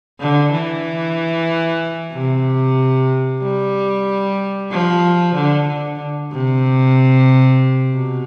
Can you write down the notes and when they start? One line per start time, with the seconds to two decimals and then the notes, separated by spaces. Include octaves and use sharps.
0.20 D3
0.52 E3
2.13 C3
3.43 G3
4.71 F3
5.35 D3
5.67 D3
6.32 C3
7.94 B2